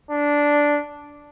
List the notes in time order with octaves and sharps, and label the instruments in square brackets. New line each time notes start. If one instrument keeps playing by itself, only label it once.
[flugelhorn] D4